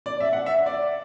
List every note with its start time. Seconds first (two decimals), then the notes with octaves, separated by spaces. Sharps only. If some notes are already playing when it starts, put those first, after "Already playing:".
0.06 D5
0.20 E5
0.33 F#5
0.46 E5
0.66 D5